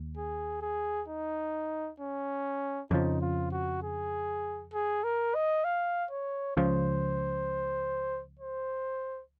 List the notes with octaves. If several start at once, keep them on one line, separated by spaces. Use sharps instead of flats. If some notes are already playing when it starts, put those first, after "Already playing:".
Already playing: D#2
G#4
G#4
D#4
C#4
F2 C#3 F3 D#4
F4
F#4
G#4
G#4
A#4
D#5
F5
C#5
C#2 C#3 F3 C5
C5